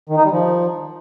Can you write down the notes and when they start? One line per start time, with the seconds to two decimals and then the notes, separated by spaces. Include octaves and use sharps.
0.09 D#3
0.17 D#4
0.24 G3
0.32 F3